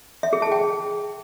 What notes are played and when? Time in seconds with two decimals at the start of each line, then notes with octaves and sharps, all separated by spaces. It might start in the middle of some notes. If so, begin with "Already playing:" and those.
0.23 E5
0.33 G#4
0.42 A5
0.52 G5